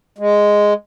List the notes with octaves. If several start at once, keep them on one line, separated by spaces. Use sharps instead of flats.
G#3